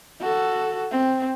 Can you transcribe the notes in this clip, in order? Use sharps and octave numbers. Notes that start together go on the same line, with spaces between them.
F#4 A4
C4